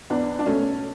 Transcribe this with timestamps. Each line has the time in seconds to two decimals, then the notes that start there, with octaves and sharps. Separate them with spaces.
0.10 E2 B3 D4
0.39 D4
0.46 B2 A3 C#4